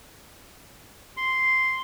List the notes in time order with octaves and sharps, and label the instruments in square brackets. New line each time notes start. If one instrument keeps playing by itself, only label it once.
[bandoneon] C6